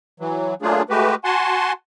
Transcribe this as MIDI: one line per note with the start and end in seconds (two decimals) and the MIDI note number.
0.20 0.54 52
0.20 0.54 54
0.62 0.82 54
0.62 0.82 57
0.62 0.82 58
0.62 0.82 62
0.62 0.82 65
0.62 0.82 68
0.90 1.15 56
0.90 1.15 57
0.90 1.15 66
0.90 1.15 67
0.90 1.15 71
1.24 1.72 66
1.24 1.72 78
1.24 1.72 80
1.24 1.72 81
1.24 1.72 84